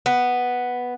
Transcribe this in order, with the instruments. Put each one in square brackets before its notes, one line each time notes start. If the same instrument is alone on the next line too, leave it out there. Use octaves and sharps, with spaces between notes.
[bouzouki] B3